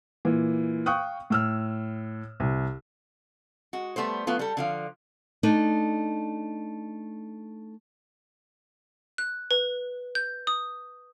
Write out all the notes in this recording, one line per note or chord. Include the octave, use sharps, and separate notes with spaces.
A#2 E3
F5 G5 C#6 D#6 F#6
A2 E6 F6
C2
G#3 F#4
G3 A3 B3 C5
F#3 A3 B3 F4
G3 A4
D3 F3 F5
A3 D4 D#4
F#6
B4
G6
D#6